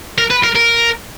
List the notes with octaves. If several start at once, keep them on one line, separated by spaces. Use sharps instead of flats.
A#4
B4
A#4
A#4